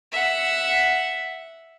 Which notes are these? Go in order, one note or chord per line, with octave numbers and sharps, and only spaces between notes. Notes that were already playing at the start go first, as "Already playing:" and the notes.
E5 F#5